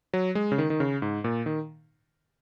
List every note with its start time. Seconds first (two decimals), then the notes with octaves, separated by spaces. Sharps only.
0.13 F#3
0.35 G#3
0.52 C#3
0.58 D#3
0.70 D#3
0.80 C#3
1.02 G#2
1.24 A#2
1.46 D#3